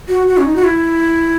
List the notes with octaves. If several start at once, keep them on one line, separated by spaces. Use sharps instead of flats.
F#4
F#4
C#4
D#4
F#4
E4